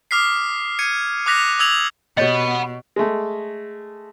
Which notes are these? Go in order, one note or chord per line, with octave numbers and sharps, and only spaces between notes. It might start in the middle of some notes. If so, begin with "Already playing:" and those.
D6 D#6 F6 B6 C7
G#6 C#7 D#7
D6 D#6 F#6 A#6 B6 F7
D#6 E6 G#6 F7 F#7
B2 G4 C#5 D#5 F#5 B5
G#3 A3